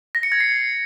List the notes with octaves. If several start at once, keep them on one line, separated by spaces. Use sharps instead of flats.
A#6
C#7
G#6
C7